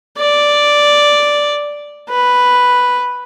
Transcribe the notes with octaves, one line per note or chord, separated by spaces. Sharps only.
D5
B4